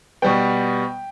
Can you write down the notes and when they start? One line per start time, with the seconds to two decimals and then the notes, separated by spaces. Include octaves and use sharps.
0.22 B2 G3 B3 G5